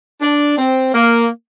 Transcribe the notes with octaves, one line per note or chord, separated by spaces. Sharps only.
D4
C4
A#3